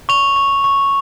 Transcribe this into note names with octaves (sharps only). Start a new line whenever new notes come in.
C#6 F7
C#6
C#6